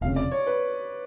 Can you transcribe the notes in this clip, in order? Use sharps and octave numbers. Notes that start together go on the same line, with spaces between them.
F1 F2 C#3 F5
D5
C#5
B4